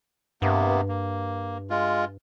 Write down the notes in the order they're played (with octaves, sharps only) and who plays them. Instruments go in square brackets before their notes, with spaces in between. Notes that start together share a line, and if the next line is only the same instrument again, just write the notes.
[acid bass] G2 [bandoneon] C3 A#3 B3
[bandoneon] A#3
G#3 F4